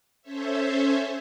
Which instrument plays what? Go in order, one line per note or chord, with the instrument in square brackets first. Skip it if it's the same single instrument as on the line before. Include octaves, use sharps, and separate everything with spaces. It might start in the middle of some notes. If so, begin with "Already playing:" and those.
[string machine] C#4 A4 C5 C#5 E5